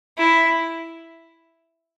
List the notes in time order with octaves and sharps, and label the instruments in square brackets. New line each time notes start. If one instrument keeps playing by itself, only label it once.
[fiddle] E4